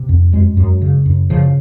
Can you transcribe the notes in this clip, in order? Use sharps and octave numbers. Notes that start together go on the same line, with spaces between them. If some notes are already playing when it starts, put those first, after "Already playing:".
Already playing: C3
F2
F#2 G#3
F#2
C#3
F#2
C#3 F3